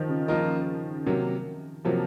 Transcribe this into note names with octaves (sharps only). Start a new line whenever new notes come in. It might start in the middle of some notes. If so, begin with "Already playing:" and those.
Already playing: D#3 F3
C#3
D#3 F3 A#3 F4 A#4 D#5
C3 F#3 A#3
C3 F3 F#3 A#3